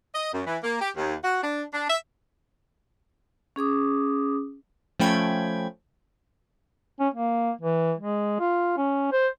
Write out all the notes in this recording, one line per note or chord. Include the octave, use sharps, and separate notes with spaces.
D#5
F#2
E3
A#3
G4
D#2
F#4
D4
D4
E5
C#4 G#4 D6 D#6
F3 A3 C#4 G5 B5 G#6
C#4
A#3
E3
G#3
F4
C#4
C5